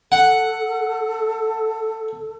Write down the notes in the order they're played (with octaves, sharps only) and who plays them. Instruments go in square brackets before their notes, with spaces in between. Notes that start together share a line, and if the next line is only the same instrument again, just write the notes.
[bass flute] A4 [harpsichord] F#5